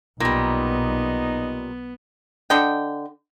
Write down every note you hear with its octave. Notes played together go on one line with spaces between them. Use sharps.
B1 A#2 G3 B3 D#4
D3 D#5 G5